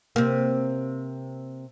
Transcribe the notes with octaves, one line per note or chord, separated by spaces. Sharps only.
C3 A#3